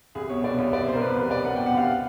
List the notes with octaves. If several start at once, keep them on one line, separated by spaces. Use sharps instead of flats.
C2 G#4
B2 C#5
B2 D5
C2 C#5
C2 D5
B2 C5
A#4
B2 B4
C2
C2 D5
B2 F#5
G5
B2
F#5
C2 F5